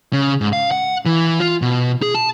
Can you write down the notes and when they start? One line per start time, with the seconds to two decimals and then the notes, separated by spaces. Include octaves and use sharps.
0.13 C#3
0.41 G#2
0.53 F5
0.71 F#5
1.06 E3
1.40 F4
1.62 B2
2.02 G#4
2.15 A5